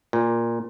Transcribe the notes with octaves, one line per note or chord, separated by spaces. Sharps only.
A#2